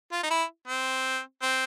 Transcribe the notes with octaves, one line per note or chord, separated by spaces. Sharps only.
F4
D#4
E4
C4
C4